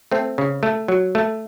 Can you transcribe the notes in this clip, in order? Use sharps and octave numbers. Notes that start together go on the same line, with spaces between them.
A3 C4
C#3
A3
F#3
A3